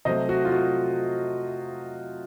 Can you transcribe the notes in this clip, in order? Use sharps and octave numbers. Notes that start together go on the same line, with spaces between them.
C3 F#3 A3 C5 D#5
F#4
F4
F#4